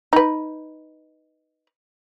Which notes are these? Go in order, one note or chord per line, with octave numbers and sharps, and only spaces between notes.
D#4 B4